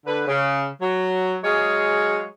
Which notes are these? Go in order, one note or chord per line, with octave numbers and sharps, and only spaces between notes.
D3 B4
C#3
F#3
F#3 G#3 G#4 C#5 F5